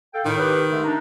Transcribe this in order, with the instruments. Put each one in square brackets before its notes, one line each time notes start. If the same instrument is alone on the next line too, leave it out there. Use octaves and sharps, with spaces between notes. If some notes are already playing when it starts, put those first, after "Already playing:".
[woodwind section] A4 F5 G5
[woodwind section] A2 [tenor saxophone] D#3
[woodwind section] G4 B4
D3 A3
D4 D#4